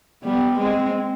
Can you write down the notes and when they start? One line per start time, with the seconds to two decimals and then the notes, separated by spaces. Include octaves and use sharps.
0.23 G3 B3
0.58 G#3 C4